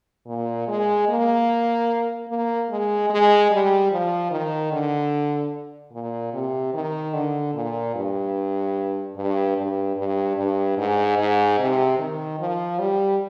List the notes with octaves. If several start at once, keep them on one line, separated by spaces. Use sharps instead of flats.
A#2
G#3
A#3
A#3
G#3
G#3
G3
F3
D#3
D3
A#2
C3
D#3
D3
A#2
G2
G2
G2
G2
G2
G#2
G#2
C3
D#3
F3
G3